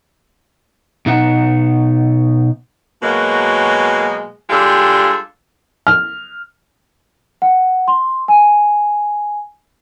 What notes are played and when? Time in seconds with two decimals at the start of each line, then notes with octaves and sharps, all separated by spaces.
1.06 B2 D#4 F#5
3.02 B2 F#3 G#3 A#3
4.50 G3 G#3 D4 F4 G4 A4
5.87 F6
7.42 F#5
7.88 C6
8.28 G#5